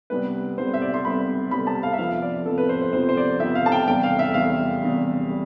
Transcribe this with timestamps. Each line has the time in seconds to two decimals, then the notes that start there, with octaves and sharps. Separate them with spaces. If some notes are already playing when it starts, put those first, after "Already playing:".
0.10 C2 C3 G3 B3 B4
0.58 C2 C3 G3 B3 C5
0.74 E5
0.82 D5
0.94 C6
1.04 C2 C3 G3 B3 B5
1.51 C2 C3 G3 B3 B5
1.67 A5
1.83 F5
1.93 E5
1.98 F2 C3 F3 B3 F5
2.22 D5
2.46 F2 C3 F3 B3 A4
2.58 B4
2.69 C5
2.82 C5
2.93 F2 C3 F3 B3 C5
3.09 C5
3.17 D5
3.40 F2 C3 F3 B3 E5
3.55 F5
3.66 A5
3.72 G5
3.87 E2 C3 G3 G5
4.03 F5
4.19 E5
4.34 E2 C3 G3 F5
4.82 E2 C3 G3
5.29 G3